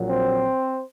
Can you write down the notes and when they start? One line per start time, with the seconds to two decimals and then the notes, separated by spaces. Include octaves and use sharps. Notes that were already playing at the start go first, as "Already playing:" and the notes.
Already playing: A#1 A#2 F#3
0.08 C4 C5